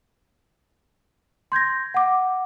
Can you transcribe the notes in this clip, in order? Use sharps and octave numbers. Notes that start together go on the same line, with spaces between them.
C6 G6 G#6 A#6
F#5 D6